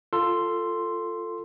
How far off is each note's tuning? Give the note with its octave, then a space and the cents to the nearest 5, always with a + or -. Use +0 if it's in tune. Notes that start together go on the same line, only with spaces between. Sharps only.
F4 +0 A4 +15 C6 +0